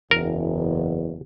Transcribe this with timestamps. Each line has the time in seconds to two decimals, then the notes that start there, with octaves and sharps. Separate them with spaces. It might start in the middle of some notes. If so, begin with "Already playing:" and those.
0.11 F#1 E2 A#4